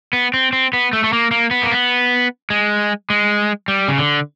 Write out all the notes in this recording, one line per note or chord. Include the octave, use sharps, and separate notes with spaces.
B3
C4
C4
B3
A3
A3
A#3
A#3
B3
A#3
B3
G#3
G#3
G3
C#3
D3